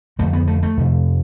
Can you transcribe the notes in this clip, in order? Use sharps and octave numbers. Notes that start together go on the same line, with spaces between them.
F2 D3 A3
B3
A3
A3
F2 C3